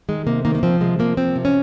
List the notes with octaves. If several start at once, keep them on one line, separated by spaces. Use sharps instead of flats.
D#3 G#3
C3 A#3
D#3 A#3
A#3
F3 C4
C3 G#3
F3 A#3
F3 C4
C3
C#4